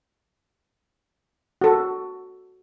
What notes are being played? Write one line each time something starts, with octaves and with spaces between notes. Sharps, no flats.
F#4 A4